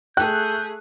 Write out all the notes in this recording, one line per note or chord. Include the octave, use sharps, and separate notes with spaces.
A3 G#4 G5 F#6 G6